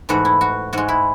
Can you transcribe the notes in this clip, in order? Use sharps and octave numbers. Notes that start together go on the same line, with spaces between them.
G#2 E3 A3 F#4
E4
F#4
G#2 G#3 F#4
E4